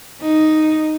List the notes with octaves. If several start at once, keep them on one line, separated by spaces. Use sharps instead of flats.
D#4